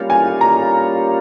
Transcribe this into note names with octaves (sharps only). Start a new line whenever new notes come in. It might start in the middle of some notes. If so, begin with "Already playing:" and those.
Already playing: G3 A#3 C#4 F4
G#5
A#5